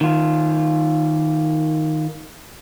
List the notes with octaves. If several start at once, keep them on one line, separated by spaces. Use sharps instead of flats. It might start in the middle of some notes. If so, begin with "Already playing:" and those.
D#3 F4